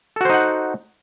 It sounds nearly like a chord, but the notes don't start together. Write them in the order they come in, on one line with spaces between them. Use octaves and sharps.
A4 F#4 C5 D#4 F#5